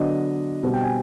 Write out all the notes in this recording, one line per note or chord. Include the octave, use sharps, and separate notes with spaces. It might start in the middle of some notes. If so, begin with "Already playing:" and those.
Already playing: D3 F#3 B3 D4 D#5
B2 G3 C4
G5
G#5